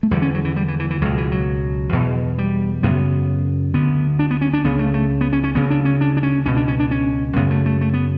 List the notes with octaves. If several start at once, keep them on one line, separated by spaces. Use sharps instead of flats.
A3
E2 D3 G3
C#4
F#3
E3
G3
E3
E3
E3
C#2 B2 F#3
E3
F#3
E2 B2
G3
F#2 C#3 B3
D2 D3 B3
D4
B3
C#4
D4
C#2 C#3 B3
A3
A3
B3
C#4
C#4
D2 C#3 B3
D4
C#4
D4
D4
C#4
C#2 B2 C#4
D4
C#4
D4
C#4
F#2 C#3 B3
A3
A3
A3
B3